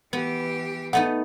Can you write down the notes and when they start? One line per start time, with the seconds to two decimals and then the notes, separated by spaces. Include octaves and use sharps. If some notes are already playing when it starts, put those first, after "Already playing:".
0.13 E3 B3 G4
0.93 A3 B3 D#4 F#5